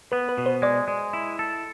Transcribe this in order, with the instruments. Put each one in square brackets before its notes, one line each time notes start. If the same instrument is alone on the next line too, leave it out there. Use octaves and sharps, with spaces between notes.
[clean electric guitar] B3 [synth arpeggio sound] B4
[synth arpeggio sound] B4
[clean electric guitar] B2
[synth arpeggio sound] C5
[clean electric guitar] G#3 [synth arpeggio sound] D5
[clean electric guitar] G#3
E4
A4